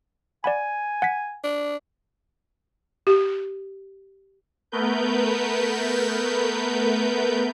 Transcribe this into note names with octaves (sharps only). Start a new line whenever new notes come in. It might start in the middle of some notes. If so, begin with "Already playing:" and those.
D5 F#5 G#5 B5
F#5 G#6 B6
D4
G4
A3 B3 A#4 B4 G6